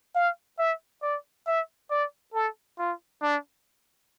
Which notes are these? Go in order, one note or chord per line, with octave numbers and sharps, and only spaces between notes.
F5
E5
D5
E5
D5
A4
F4
D4